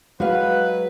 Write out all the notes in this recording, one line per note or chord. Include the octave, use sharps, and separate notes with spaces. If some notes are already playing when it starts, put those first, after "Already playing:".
F#3 G#3 F#4 B4 F5